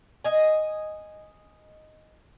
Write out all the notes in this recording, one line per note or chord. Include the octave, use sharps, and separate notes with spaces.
D#5 G#5